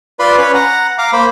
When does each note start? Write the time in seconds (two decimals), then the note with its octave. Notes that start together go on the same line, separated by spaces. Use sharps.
0.19 F4 B4 D5 B5 C6
0.38 C#4 B4 C#5
0.54 F#5 A#5
0.98 F5 A#5 D6
1.13 A#3 C5 B5